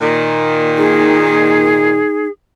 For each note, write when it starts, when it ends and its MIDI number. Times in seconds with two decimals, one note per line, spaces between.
0.01 2.01 46
0.01 2.01 51
0.77 2.27 63
0.77 2.30 68